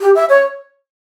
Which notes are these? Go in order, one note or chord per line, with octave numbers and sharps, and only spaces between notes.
G4
E5
C#5